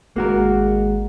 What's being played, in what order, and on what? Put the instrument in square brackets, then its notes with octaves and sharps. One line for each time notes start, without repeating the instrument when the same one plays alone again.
[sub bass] G#1 [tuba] G#3 [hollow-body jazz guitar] A#3 F#4 A#4